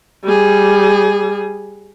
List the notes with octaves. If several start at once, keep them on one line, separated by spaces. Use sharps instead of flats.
G3 G#4